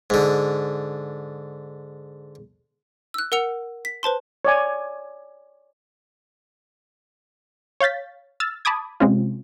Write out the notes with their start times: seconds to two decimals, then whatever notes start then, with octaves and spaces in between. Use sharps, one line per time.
0.10 G#2 D3
3.14 E6 F#6
3.32 A#4 F#5 E6 C#7 F7
3.85 B6
4.03 B4 C5 A5 C6
4.45 C#5 D5 G#5
7.80 C#5 F5 G6 A6 B6
8.40 E6 F6 A6
8.65 A5 B5 D6 D#6 G#6
9.00 C3 G#3 C4 C#4 F4